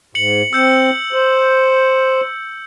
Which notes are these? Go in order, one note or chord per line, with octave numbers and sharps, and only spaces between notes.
G#2 C#7 F#7
C4 E6 G6 C#7
C5